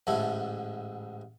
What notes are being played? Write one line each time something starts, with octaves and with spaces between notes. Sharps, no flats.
A1 G#2 D3 E4 A4